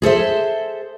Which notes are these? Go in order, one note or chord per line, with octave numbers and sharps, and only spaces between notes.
G#4 A4 C5 E5